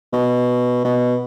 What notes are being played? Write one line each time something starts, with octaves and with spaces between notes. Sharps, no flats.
B2
B2